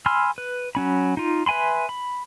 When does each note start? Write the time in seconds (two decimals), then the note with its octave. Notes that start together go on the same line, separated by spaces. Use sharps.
0.06 G#5 B5 C6 E6 F6
0.38 B4
0.75 F#3 C#4 B5
1.17 D#4 F4
1.46 B4 E5 G#5 B5 C6
1.89 B5